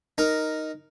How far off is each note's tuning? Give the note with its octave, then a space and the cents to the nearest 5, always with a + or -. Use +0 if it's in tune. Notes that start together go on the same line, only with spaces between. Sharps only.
D#4 +0 A#4 +0